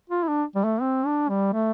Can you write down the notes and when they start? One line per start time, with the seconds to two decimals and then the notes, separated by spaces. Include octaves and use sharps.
0.09 F4
0.23 E4
0.27 D4
0.55 G3
0.64 A3
0.81 C4
1.06 D4
1.29 G3
1.53 A3